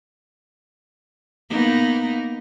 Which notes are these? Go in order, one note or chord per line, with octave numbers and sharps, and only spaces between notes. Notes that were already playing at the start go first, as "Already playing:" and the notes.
A#3 B3 D#4